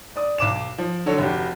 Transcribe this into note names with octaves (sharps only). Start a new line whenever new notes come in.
D5 D#6
B1 D6 E7
F3
D3 F#3 A4 C#5
F1 F#4 G4